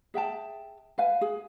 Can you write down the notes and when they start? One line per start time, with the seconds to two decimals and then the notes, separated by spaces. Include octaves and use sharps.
0.14 G#4 E5 G5 A5
0.98 B4 F5 G#5
1.21 G#4